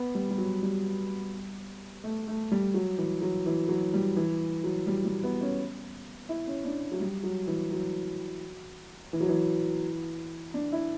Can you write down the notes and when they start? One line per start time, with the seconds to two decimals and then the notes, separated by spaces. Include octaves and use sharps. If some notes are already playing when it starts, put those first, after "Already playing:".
Already playing: B3
0.15 G3
0.31 G3
0.38 F#3
0.63 G3
2.04 A3
2.27 A3
2.51 G3
2.74 F#3
2.98 E3
3.22 F#3
3.46 E3
3.69 F#3
3.94 G3
4.16 E3
4.64 F#3
4.87 G3
5.05 G3
5.24 B3
5.41 C#4
6.29 E4
6.47 C#4
6.65 D4
6.92 F#3
7.00 G3
7.23 F#3
7.47 E3
7.71 F#3
9.13 E3
9.21 F#3
9.29 E3
10.54 D4
10.72 E4